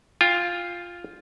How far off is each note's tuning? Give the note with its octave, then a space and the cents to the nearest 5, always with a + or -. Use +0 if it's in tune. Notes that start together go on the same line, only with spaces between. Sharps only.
F4 +0 G5 +30